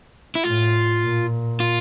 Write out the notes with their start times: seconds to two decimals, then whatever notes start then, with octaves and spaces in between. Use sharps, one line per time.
0.35 E4
0.43 A2 F4
1.01 A#2
1.60 F4